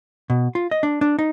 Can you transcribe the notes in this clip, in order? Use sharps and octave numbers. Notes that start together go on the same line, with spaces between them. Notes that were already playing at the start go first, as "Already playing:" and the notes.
B2
F4
D#5
D4
D4
D#4